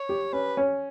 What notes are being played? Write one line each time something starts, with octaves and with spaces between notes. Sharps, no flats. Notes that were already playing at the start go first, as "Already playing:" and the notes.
Already playing: C#5
G4
C#4 B4
C#4